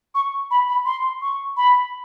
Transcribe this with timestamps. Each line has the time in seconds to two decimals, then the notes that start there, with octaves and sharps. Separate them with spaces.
0.15 C#6
0.51 B5
0.68 B5
0.85 C6
1.21 C#6
1.57 B5